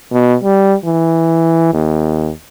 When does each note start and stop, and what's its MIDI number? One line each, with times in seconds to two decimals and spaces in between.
0.12 0.35 47
0.43 0.74 55
0.85 1.68 52
1.73 2.31 39